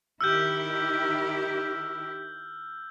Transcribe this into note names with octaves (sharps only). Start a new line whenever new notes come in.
D#3 E4 G4 E6 F6 G6